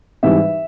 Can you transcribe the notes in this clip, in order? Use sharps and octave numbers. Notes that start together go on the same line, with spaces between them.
G#2 E3 G3 E5